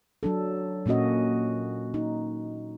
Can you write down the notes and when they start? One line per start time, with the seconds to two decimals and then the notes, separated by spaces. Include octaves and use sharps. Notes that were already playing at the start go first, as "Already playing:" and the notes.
0.23 F#3 D4 A4
0.86 A#2 A#3 C#4 F#4 D#5
1.94 D#4